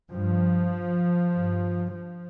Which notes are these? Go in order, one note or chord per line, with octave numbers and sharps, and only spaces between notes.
G2 F3
G2
F3